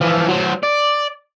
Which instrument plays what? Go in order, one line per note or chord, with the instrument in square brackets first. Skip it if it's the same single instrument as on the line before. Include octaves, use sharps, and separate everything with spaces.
[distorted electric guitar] E3 F3
F#3 C5
D5